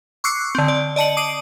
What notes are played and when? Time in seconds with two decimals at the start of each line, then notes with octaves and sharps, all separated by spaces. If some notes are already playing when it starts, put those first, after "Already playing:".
0.24 C#6 D6 E6 F#6 C7 C#7
0.55 D3 C4
0.68 D5
0.96 D5 D#5 A5 C#7 F#7
1.17 D6 D#6 C7 D7 D#7